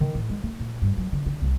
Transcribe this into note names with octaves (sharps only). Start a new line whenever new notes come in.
D#3
A2
G#3
A3
A#2
G2
F#3
D3
D3
C2